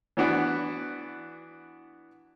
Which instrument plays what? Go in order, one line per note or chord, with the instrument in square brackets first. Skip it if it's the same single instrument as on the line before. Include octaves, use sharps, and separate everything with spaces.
[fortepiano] E3 B3 D4 F#4